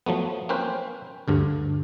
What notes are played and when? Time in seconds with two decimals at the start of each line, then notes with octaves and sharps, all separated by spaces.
0.06 F3 F#3 A3 B3
0.49 A#3 C4 C#4 B4 C5 F5
1.28 D2 G2 D3